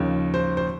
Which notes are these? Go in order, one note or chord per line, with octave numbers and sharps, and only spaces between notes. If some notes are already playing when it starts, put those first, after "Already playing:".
Already playing: D#2 C#3 F3 C#5
C5
C5